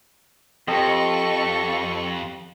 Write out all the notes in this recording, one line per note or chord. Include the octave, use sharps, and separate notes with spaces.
F2 G4 A4 C5 D#5 F5 G5 C#6